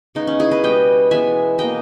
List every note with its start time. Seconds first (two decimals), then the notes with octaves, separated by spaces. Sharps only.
0.15 C#3 G#3 B3 D#4
0.27 C#4
0.39 E4 G#4
0.51 B4 D#5
0.63 B2 G3 B3 D#5 G5
1.11 E3 G#3 B3 E5 G#5
1.58 B2 A#3 D#5 G5